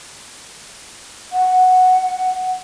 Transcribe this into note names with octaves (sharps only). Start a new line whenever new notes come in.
F#5